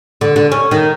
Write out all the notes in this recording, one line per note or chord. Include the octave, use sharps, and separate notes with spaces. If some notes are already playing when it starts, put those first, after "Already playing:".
D3
D3
C#4
D#3